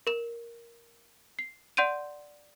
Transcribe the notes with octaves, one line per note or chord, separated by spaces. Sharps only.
A#4 E7
C7
D5 F#5 C6 G6 D7 D#7